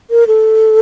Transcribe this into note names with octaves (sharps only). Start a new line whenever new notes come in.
A#4
A4